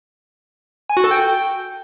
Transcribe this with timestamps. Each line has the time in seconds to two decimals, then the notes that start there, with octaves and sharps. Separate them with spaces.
0.89 G#5
0.97 F#4
1.04 A4
1.11 G5